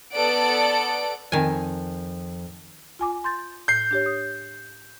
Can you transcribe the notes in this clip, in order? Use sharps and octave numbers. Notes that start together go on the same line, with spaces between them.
B3 A4 D5 F#5 D7
F2 D#3 G#5
F4 G#5 D6
C6 G6 A6
A2 G6 C7
D4 G4 C#5
D#6